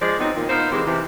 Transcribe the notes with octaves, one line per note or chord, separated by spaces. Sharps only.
F3 G#3 D5
F#3 B3 C4 D#4
A#2 D#3
B3 D#4 F4 A#4 C5
C3 E3 G#3 A#3 C4 G4
C3 E3